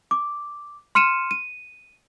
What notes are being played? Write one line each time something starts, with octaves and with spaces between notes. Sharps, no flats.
D6
C6 F6 C#7 D#7 E7
D#7